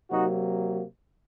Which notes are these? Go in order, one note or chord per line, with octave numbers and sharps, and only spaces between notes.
C3 F#3 A#3 D#4 F#4